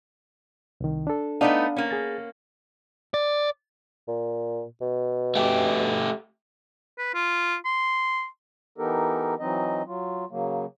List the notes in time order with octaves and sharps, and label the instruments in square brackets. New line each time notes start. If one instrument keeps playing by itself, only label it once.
[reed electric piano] C2 D#3
D4 A4
[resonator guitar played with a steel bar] A3 B3 D#4 [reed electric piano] D4 F5 F#5
[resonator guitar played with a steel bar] A#3 C#4
[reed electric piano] G#4 A6
[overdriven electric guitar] D5
[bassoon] A#2
B2
[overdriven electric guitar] A3 G4
[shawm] B4
F4
C6
[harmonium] E3 B3 D#4 G4 A4 A#4
E3 F#3 C4 D#4 D#5
F#3 F4
C#3 F#3 A#3